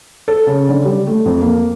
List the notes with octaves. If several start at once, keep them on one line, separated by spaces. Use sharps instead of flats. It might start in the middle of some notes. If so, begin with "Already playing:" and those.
A4
C#3
D3
G3
A3
F2
A#3